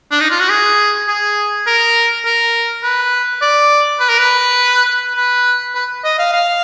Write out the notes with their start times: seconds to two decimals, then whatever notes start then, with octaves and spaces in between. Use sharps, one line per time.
0.11 D4
0.21 D#4
0.31 F4
0.40 F#4
0.50 G#4
1.08 G#4
1.67 A#4
2.25 A#4
2.83 B4
3.42 D5
4.00 B4
4.09 A#4
4.19 B4
5.16 B4
5.75 B4
6.04 D#5
6.19 F5
6.33 F5